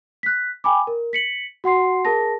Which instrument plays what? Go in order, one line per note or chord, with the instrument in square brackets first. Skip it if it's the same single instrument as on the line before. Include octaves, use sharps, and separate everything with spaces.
[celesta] F#6 B6
G5 G#5 B5 D6
A#4
B6 C#7 F#7
F#4 F#5 C6 C7
G#4 A#4 A5 A#6